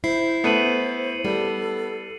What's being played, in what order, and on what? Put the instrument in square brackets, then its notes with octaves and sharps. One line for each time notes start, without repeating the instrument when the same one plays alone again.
[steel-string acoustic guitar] E4 [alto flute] C5 [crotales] C7
[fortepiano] A3 B3 [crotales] C#7 D#7 F#7
[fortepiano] G3 [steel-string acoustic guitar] B3 [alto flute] A4